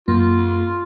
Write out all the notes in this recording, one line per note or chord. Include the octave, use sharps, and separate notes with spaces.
F#2 A#3 F4